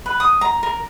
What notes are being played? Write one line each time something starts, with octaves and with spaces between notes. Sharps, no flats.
B4
D#6
A#5
A#4